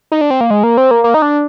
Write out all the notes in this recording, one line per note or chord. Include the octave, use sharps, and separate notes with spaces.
D#4
D4
C4
A#3
G#3
A#3
C4
A#3
A#3
D#4
D4